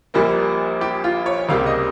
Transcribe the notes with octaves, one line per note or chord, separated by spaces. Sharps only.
A#1 A#2 G3 A#3
G4
F4
C#5
C#2 C3 G3 A#3 F5
D#5